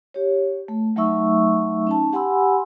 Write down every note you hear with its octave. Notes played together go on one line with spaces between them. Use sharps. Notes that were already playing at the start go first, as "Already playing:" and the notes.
G4 C#5
A3
F#3 A3 D#4 E5 C#6 E6
C#4 D#4 A5
G4 F#5 G#5 B5 C6 E6